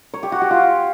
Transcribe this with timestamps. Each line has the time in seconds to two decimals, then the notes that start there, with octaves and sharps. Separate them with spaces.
0.14 C#5
0.23 G4
0.32 F#4
0.41 G4
0.51 F4